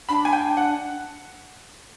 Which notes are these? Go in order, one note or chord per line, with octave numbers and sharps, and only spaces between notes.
D4 B5
G#5
G5
F#5